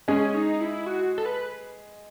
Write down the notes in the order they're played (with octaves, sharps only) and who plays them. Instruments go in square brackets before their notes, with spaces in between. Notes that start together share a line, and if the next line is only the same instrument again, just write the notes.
[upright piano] G#3 G#4 [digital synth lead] C#4
[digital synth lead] D#4
E4
F#4
A4
B4